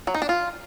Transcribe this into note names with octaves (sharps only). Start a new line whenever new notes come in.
F#3
D#4
D4
F4